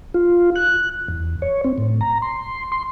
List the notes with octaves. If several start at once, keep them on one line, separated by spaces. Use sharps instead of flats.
F4
F#6
E2
C#5
C4
A2
A#5
C6
C6